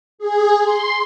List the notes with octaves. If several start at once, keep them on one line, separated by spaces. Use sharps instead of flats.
G#4
C6